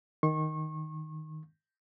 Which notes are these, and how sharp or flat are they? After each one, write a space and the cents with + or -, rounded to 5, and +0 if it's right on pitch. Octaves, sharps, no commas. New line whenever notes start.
D#3 +0 C#6 -35